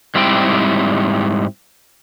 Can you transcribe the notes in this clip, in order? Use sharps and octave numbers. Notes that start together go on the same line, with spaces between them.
G#2 G3 C4 E4 G5